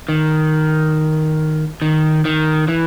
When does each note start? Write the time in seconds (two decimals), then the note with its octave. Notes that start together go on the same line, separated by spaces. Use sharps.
0.09 D#3
1.82 D#3
2.25 D#3
2.68 E3